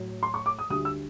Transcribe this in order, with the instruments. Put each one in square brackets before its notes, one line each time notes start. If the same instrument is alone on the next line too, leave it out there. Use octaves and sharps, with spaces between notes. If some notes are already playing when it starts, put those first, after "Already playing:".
Already playing: [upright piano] A2 F#3
C6
C#6
D6
D#6
D2 D3 G3 D#6
E6